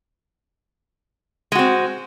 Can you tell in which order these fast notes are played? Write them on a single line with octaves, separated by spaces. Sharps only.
G#3 F#4 C4